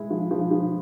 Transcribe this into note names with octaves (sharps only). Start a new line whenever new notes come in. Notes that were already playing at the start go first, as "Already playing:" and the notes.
Already playing: G#3 E4
F3
F3
F3